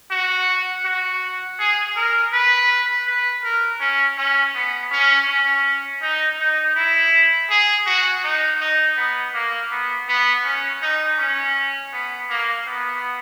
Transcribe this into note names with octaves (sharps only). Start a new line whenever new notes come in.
F#4
F#4
G#4
A#4
B4
B4
A#4
C#4
C#4
B3
C#4
C#4
D#4
D#4
E4
G#4
F#4
D#4
D#4
B3
A#3
B3
B3
C#4
D#4
C#4
B3
A#3
B3